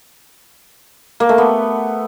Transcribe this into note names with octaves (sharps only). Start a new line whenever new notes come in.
A#3
A3
B3